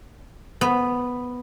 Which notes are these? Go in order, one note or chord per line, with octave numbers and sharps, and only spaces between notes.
B3